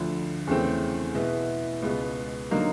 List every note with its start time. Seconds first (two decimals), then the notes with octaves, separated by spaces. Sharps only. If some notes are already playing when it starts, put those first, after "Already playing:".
Already playing: D2 D3 F3
0.47 E2 C#3 E3 A3 C4
1.15 B2 G#3 B3 E4
1.83 C#2 B2 G#3 B3
2.51 D3 F#3 A#3 D#4